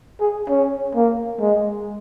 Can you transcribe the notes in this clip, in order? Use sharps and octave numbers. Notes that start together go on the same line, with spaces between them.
G#4
C#4
A#3
G#3